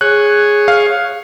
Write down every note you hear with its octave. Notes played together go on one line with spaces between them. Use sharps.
G#4 C#5 F#6
F5